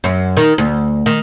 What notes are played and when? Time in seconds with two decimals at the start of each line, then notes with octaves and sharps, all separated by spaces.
0.04 F#2
0.37 D#3
0.58 D2
1.06 D#3